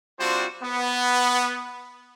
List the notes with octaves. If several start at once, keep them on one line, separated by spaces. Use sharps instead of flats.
G3 C4 D4 F4 F#4 C5
B3